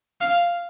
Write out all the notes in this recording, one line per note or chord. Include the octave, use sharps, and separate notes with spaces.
F5